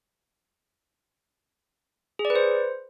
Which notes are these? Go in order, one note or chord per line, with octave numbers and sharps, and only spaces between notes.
G#4
D5
B4
C5